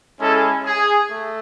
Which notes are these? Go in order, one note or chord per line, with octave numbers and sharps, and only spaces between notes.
G#3 C#4 E4 A4
G#4
A3